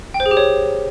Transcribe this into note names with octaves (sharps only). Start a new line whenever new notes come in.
G5
C5
G#4
G4
C#5